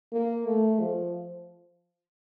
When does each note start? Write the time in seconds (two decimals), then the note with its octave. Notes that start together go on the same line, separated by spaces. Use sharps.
0.13 A#3
0.46 A3
0.80 F3